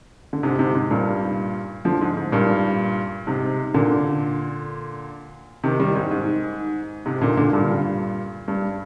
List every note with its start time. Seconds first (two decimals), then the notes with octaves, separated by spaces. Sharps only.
0.33 D3
0.43 G#2 C3
0.59 G#2 C3
0.75 G#2
0.91 G2 A#2
1.85 D3 F3
2.01 G#2
2.17 G#2
2.32 G2 A#2
3.27 G#2 C3
3.74 A#2 D3
5.64 C3 D#3
5.80 D#3 G3
5.95 G#2
6.11 G#2
7.05 G#2 C3
7.21 A#2 D3
7.37 A#2 D3
7.53 G2 A#2
8.48 G2